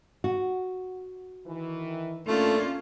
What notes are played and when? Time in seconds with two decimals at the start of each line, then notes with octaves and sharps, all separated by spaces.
0.24 F#4
1.47 D#3 E3
2.27 A3 A#3 C#4 D4 F4